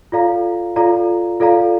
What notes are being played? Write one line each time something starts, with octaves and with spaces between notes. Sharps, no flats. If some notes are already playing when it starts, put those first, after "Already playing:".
F4 A4 D5 F5 A#5
F4 A4 D5 F5 A#5
F4 A4 D5 F5 A#5